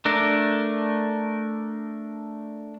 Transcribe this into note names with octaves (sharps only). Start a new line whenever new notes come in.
A3 D4 A#4